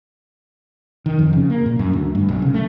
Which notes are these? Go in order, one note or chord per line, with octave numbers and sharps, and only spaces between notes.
D#3
F2
C#3
A#3
A#2
F#2
D2
G2
B1
C#3
A3